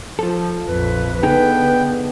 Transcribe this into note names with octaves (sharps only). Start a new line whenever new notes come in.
F3 F4 A4
A#1 F2 B4
D3 B3 D#4 G#4 A4 G5